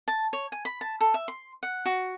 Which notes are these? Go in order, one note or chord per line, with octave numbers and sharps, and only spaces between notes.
A5
C#5
G#5
B5
A5
A4
E5
C6
F#5
F#4